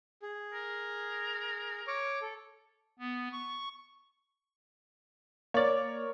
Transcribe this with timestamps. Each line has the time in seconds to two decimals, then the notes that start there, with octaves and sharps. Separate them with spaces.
0.22 G#4
0.54 A#4
1.87 C#5 C#6 D6
2.21 A4
2.99 B3
3.32 C#6
5.54 A#3 A#4 C#5 D5